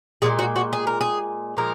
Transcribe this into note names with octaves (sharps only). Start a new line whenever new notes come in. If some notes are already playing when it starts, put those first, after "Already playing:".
A#2 F3 G#3 G#4
F#4
F#4
G#4
A#4
G#4
A#2 F3 G#3 A#4